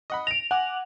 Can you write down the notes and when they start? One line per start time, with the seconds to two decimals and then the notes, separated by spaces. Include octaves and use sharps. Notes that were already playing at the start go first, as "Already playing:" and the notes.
0.10 D#5 F#5 B5
0.27 A#6 D7 F7
0.51 F#5 G#5 D6